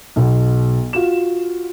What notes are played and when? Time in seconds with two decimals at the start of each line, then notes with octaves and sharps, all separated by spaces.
0.16 B1 B2
0.93 F4 F#4 E7